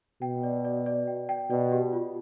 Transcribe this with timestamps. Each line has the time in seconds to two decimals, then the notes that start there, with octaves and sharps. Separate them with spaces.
0.22 B2 G5
0.43 D5
0.65 D5
0.86 D5
1.07 G5
1.29 G5
1.50 B2 D5
1.72 G4
1.93 F4